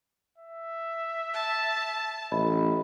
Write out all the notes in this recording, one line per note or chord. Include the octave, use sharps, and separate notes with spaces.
E5
A5
A1 D#5 E5 B5